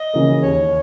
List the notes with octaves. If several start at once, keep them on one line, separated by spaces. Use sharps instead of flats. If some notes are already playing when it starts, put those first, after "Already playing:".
Already playing: D#5
C#3 E3 A#3
D#2 C#5